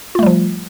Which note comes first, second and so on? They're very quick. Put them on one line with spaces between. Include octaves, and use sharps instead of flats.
F4 A3 G3 F3